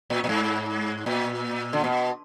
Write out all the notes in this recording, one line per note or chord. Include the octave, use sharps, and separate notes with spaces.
A#2
A#2
G#2
A#2
D3
B2